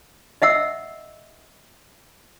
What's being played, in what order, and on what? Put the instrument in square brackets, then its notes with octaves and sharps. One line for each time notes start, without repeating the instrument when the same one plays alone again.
[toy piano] D#5 E5 F#5 E6